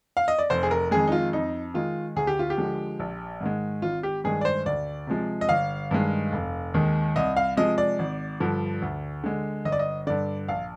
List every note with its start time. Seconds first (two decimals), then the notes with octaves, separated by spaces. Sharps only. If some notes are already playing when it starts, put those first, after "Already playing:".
0.17 F5
0.28 D#5
0.39 D5
0.50 F1 C5
0.63 G#4
0.71 A#4
0.91 F2 D#3 G#3 G#4
1.08 D#4
1.12 F4
1.33 F2 D#4
1.74 D#3 G#3 F4
2.16 D2 G#4
2.27 G4
2.39 F4
2.50 G4
2.58 D3 F3 G#3
3.00 A#1
3.41 G#2 D#3 G#3
3.82 G#1 F4
4.03 G4
4.24 G2 D#3 G#3 G#4
4.41 D5
4.45 C5
4.66 D2 D5
5.07 C3 F3 G#3
5.41 D#5
5.49 G1 F5
5.91 G2 D#3 G#3
6.32 F1
6.74 D#2 D#3 G#3
7.16 C2 D#5
7.37 F5
7.57 C3 F3 G#3 D#5
7.78 D5
7.99 G#1
8.40 G2 D3 F3
8.82 D2
9.24 D3 G#3
9.65 G1 D#5
9.72 D5
9.79 D#5
10.07 G2 D3 D5
10.48 A#1 F5